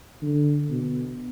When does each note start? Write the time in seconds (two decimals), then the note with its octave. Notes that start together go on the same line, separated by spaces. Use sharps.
0.22 D3
0.70 B2